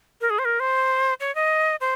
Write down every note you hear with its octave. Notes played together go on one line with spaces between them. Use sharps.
A#4
G#4
C5
A#4
C5
C#5
D#5
C5